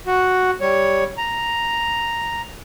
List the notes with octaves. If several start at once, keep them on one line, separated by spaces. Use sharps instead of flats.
F#4
G3 C#5
A#5